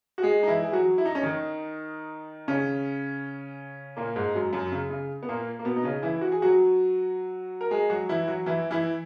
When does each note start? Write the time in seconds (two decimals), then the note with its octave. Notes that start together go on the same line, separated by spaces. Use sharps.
0.18 F#4
0.22 G#3 G#4
0.43 D#4
0.47 E3 E4
0.63 G#4
0.72 F#3 F#4
0.98 E4
1.05 D#4
1.15 C#4
1.23 D#3 D#4
2.48 C#3 C#4
3.97 A#2 A#3
4.16 G#2 G#3
4.34 F#2 F#3
4.53 F#2 F#3
4.72 C#3
4.90 C#3
5.23 B3
5.29 A#2 A#3
5.59 A#3
5.65 B2 B3
5.76 D#4
5.84 C#3 C#4
6.03 E3 E4
6.21 F#4
6.32 G#4
6.42 F#3 F#4
7.61 A#4
7.71 G#3 G#4
7.90 F#3 F#4
8.09 E3 E4
8.28 F#3 F#4
8.46 E3 E4
8.71 E3 E4